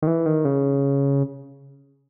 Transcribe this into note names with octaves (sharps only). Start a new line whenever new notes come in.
D#3
E3
D#3
C#3